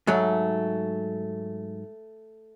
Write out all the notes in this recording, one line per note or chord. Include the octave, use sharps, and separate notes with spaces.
G#2 F#3 A3